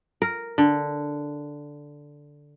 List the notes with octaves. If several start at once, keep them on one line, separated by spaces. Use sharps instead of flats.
A#4
D3